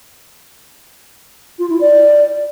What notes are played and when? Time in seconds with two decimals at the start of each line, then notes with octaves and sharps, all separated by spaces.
1.59 F4
1.70 E4
1.81 D5